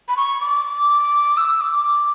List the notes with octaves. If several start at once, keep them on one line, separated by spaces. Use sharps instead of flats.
B5
C#6
D6
E6
D6